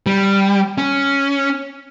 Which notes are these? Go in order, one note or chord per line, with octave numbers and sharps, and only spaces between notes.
G3
C#4